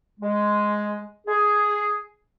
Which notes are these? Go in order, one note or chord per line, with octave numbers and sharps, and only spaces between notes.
G#3
G#4